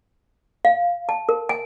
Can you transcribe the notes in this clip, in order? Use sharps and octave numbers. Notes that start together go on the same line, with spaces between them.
F5
A5
A#4
G#5